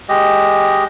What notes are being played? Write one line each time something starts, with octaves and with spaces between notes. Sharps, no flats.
G#3 G4 D#5